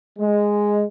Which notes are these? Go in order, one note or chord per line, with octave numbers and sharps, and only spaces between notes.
G#3